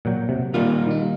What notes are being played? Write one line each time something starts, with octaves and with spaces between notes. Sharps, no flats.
A#2 F#3 F#5 G5
C3
A#2 D#3 G3 A#3 F4
D#3 D#4